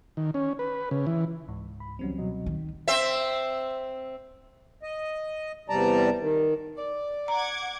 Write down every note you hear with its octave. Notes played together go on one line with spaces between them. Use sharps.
D#3
C#4
B4
C#3
E3
C#2 G#2
B5
C#2 E3 F#3 G3 C4 C#4
B2 F#3 D#5
D#3
C4 C5 E5
D#5
E2 C3 G3 D5 A5 A#5
D#3
D5
F#5 A#5 D6 G#6